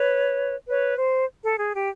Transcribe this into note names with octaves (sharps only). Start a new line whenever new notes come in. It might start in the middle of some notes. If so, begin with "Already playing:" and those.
Already playing: B4 C#5
B4 C#5
C5
A4
G#4
G4